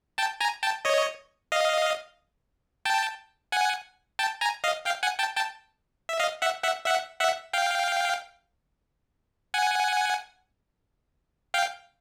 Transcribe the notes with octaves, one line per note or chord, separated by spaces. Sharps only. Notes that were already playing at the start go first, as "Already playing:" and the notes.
G5 A5
G#5 A#5
G5 A5
C#5 D#5
D#5 F5
G5 A5
F#5 G#5
G5 A5
G#5 A#5
D#5 F5
F5 G5
F#5 G#5
G5 A5
G5 A5
E5
D#5 F5
E5 F#5
E5 F#5
E5 F#5
E5 F#5
F5 G5
F#5 G#5
F5 G5